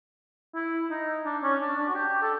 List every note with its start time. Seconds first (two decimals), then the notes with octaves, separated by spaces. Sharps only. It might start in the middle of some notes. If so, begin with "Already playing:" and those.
0.55 E4
0.90 D#4
1.25 D4
1.43 C#4
1.60 D4
1.78 D4
1.89 F#4
1.95 G4
2.22 A4